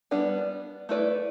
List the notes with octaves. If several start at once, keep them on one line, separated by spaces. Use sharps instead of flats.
G3 B3 D4
A3 E4 B4 D5